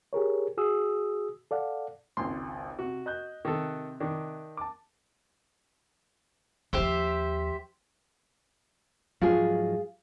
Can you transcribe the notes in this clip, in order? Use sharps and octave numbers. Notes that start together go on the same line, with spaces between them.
G4 G#4 A#4 C#5
F#4 G#4 D#6 E6
A4 D5 F5 F#5
G#1 C#2 C6
C3 F#4
D#5 F#6 G6
C3 D#3 A4
D#3 D4
A5 D6
D#2 F3 G4 C5 E5
G#2 F3 F#3 F4 G#4